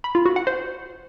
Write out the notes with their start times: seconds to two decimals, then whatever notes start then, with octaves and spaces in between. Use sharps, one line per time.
0.04 B5
0.15 F4
0.26 F#4
0.36 F#5
0.47 C5